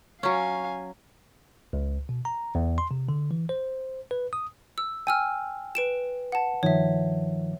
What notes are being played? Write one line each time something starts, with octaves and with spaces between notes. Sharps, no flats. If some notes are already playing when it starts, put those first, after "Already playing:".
F#3 C#4 F5 G#5
C#2
B2
A#5
E2
C6
C3
D3
E3
C5
B4
D#6
E6
G5 G#5 E6 F6
B4 D7 E7
F#5 A5
G2 D#3 F3 C#5 E5